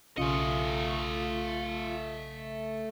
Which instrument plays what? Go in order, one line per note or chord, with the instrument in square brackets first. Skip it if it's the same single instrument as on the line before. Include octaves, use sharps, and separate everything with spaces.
[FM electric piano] B1 C#3 C#7 [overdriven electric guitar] A3 D#5 [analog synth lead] F4